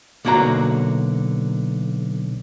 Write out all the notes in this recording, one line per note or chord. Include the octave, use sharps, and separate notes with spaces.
B1 D3 A#3 F#4 F#5 A#5